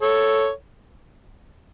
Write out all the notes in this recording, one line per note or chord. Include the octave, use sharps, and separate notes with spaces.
A4 C#5